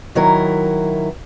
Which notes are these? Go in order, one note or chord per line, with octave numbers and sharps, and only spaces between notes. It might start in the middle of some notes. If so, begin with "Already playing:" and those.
D#3 F#3 E4 A#4